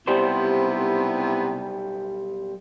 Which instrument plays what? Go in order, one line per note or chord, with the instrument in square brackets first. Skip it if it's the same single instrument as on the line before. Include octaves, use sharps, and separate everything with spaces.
[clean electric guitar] B1 G3 C5 [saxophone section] C3 B3 E4